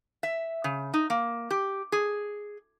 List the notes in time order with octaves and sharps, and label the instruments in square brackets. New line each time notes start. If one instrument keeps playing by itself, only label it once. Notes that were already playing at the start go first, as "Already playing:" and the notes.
[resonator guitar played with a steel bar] E5
C#3
D#4
A#3
G4
G#4